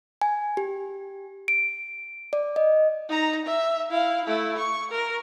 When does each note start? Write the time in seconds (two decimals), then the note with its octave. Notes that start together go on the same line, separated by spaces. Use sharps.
0.22 G#5
0.57 G4
1.48 D7
2.33 D5
2.56 D#5
3.09 D#4 A#5
3.46 E5
3.91 E4 F5
4.24 A3 E4
4.58 C#6
4.91 A#4